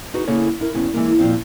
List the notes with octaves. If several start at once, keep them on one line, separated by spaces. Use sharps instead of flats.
D#4 F#4 G#4 B4
C#3 A#3 E4 G#4 A4 C#5
E4 A#4
G2 C#3 B3
E3 G#3 A#3
F2 A#2 F3 C4 F5